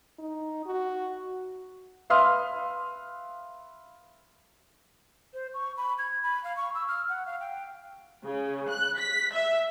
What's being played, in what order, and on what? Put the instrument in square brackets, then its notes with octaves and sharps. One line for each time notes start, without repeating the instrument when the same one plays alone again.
[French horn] D#4
F#4
[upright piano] B4 E5 F5 C6 D#6 F6
[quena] C5
C#6
B5
G#6
B5
F5
C#6
E6
F6
F#5
F5
G5
[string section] C#3
F#6
B6
E5